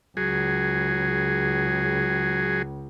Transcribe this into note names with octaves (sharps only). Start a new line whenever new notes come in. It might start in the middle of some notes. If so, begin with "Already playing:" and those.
C#2 F#3 G#4